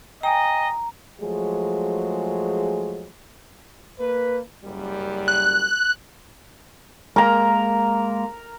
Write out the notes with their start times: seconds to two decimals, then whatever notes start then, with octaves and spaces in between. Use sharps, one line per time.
0.23 D#5 G5 G#5 A#5
1.21 F3 F#3 G#3 A3 G#4
3.98 A#3 B4
4.63 F#1 F#2 G3
5.28 F#6
7.16 G#3 A#3 A#4 A#5